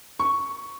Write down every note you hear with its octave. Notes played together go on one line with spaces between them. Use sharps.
C#6